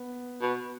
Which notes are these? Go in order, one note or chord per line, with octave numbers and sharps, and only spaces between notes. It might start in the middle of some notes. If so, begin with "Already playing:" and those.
Already playing: B3
B2